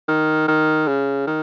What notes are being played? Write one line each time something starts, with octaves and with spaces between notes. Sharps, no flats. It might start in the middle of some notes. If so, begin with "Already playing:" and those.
D#3
D#3
C#3
D#3